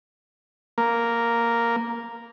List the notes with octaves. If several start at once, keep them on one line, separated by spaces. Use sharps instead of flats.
A#3